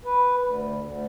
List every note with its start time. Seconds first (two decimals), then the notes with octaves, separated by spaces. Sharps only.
0.05 B4
0.44 D2
0.82 D2